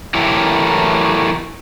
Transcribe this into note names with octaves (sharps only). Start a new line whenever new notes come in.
E3 F#3 A3 E4 G4 A#4